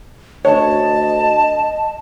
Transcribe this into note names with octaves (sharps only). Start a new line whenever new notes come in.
D2 C#5 D#5 A5